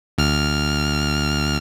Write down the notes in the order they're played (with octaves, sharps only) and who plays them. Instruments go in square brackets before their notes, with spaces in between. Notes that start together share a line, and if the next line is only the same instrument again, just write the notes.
[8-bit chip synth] D2 F6